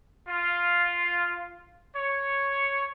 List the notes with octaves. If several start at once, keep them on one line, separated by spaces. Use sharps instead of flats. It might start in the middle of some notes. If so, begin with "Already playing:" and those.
F4
C#5